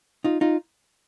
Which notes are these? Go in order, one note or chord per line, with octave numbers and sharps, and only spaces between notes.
D#4 F4
D#4 F4